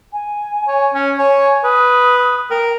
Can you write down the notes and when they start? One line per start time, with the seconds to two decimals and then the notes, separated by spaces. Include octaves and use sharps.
0.13 G#5
0.68 C#5
0.94 C#4
1.18 C#5 G#5
1.64 B4 D#6
2.50 A#4 G5